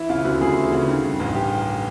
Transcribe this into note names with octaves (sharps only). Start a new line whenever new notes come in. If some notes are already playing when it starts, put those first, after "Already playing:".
Already playing: E3 E4
C#3 F4
D2 F#4
D2 G#4
E3
C#3
D#3
G2
A1
G4